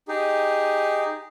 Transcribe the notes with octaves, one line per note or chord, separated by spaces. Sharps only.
D#4 G4 G#4